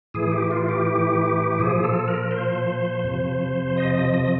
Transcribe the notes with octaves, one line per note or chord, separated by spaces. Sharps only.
A2 E3 G#4
G4
F4
G4
A#2 F3 G#4
A4
A#4
C5
F2 C3 F3
D#5
D#5
D#5
D#5